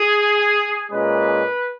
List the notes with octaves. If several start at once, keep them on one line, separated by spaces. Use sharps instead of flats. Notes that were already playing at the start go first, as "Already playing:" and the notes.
Already playing: G#4
A#2 G#3 C#4 B4